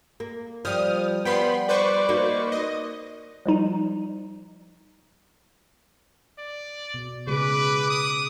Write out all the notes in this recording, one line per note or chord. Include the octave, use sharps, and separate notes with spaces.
A#3
F3 G3 D#6 F6
G3 B3 G5 B5 C6
B4 C5 D5 C#6
A#3 D#4 F#4
D#5
F3 G3 D#4
D5
B2
C#3 G#3 G#4 B4 D6
D#6